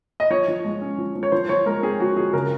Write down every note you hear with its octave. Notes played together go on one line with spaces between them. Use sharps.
D#5
F3 C#5
F3
G#3
C#4
F3
F3
C#5
F3 C5
F3 C#5
G#3 A#4
C4 G#4
F3 F#4
F3 G#4
C#3 A#4